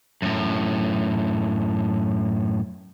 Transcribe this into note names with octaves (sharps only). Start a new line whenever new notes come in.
F#2 A2